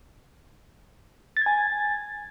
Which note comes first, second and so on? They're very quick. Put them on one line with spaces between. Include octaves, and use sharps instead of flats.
A6 G#6 G#5